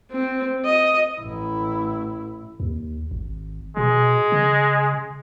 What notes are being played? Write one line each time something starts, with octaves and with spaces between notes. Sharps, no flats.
C4
D#5
A1 E4
D#2
G#1
B2 G#3
C#3